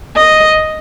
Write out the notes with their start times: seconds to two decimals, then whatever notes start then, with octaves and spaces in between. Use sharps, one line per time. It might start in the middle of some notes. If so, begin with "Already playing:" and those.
0.17 D#5